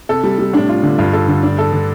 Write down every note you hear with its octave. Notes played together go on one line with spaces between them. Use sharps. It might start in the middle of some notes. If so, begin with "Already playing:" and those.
C3 A4
G3
G3
A2 D4
F4
D3
G2 F4
A4
D3
D4
A4
D3